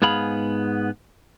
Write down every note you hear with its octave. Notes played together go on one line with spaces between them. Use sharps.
G#2 B3 G#4 F5 B5